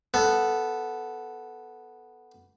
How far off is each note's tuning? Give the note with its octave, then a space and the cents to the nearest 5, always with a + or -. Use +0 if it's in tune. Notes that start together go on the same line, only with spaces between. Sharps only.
B3 +0 A4 +0